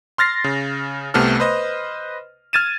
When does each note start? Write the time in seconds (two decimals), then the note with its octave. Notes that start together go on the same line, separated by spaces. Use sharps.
0.18 C6 F6 A6 A#6 C7
0.44 C#3
1.14 C2 C3 A3 B3 A4 F6
1.40 B4 C5 D#5
2.53 F6 G#6 A6 D#7 E7